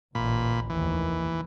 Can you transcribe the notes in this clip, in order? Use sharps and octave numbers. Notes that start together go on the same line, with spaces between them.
A1 D2 A#2 B5
F1 D#2 D#3 E3